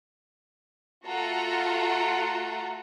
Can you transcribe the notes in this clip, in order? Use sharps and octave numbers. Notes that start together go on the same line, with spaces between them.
A3 F4 F#4 A4 F#5 A#5